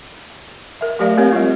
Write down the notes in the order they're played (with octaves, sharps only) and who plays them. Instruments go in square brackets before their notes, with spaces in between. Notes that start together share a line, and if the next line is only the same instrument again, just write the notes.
[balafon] A#4 E5
F#3 A3 G4 A#4 D5 F5
A#3 C4 G4 A#4 C#5
G3 F4